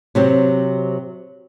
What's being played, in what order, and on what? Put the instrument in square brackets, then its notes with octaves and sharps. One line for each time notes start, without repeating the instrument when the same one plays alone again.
[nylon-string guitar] C3 F#3 C4